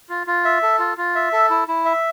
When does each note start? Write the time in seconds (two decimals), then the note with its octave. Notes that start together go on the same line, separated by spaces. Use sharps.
0.09 F4
0.27 F4
0.45 E5
0.62 A4
0.79 F4
0.97 F4
1.15 E5
1.32 A4
1.50 E4
1.68 E4
1.85 E5